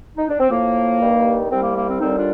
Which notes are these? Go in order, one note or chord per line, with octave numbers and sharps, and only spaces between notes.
D#4
D4
C4
A2 F3 A#3
G2 D#3 G3
C2 C3 G3 C4
A#3
A#3
C4
D#2 D3 G3 C4 D#4
D#4
D4 F4